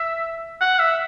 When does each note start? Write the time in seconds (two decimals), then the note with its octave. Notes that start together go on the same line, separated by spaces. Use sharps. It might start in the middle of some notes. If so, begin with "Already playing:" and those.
Already playing: E5
0.61 F#5
0.79 E5